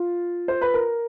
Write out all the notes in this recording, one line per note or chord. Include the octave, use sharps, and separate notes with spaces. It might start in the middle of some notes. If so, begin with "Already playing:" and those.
Already playing: F4
C5
B4
A#4